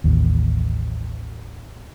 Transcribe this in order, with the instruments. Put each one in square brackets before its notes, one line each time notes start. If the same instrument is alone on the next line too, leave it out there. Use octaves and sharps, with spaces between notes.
[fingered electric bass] A1 D#2